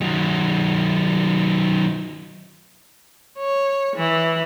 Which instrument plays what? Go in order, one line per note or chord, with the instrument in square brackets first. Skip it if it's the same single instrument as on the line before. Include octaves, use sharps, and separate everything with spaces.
[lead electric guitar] D#3 F#3
[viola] C#5
E3